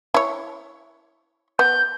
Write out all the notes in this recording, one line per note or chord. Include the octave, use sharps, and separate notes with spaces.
E4 C#5
B3 G6